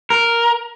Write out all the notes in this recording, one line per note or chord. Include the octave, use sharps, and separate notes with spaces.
A#4